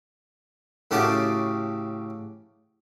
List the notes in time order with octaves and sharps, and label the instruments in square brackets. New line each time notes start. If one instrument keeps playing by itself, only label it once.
[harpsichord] A2 C#3 C#4 F#4 G4 A5